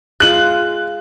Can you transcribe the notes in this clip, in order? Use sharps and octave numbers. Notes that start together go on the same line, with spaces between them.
G#3 F4 F#6 F#7